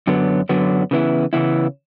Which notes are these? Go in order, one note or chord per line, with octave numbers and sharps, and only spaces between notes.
F#2 D3 F#3 B3
F#2 D3 F#3 B3
C#3 E3 B3 E4
C#3 E3 B3 E4